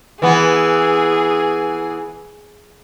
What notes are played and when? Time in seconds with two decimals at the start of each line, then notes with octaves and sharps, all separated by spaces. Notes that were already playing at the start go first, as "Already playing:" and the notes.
0.22 E3 B3 G#4